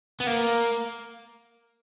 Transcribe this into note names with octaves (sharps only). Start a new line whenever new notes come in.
B3
A#3